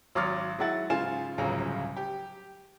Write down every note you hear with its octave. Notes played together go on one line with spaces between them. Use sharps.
G#1 F#3 C6 D6 F6 A6
F#3 G#3 E4 F#5 A6
G#2 C#3 F4 G#5 E7
D1 G1 C#2 C#3 F#3 A#5
G4